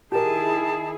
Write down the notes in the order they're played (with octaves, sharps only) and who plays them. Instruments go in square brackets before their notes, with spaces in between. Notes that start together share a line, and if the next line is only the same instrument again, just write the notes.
[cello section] D#3 E4 G#4 [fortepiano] G4 A#4 [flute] A5